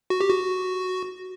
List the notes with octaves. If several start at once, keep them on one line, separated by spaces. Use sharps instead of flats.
F#4
G4
F#4